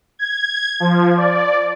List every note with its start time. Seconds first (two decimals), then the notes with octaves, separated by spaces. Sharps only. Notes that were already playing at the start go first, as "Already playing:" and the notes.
0.19 G#6
0.80 F3
1.17 D5